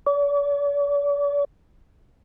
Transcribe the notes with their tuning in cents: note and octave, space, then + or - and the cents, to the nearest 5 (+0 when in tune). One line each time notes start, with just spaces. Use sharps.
D5 -45